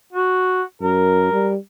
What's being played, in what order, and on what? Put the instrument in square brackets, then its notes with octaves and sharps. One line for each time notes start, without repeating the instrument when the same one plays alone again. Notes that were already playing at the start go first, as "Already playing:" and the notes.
[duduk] F#4
[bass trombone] F#2 [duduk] A#4
[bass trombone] G3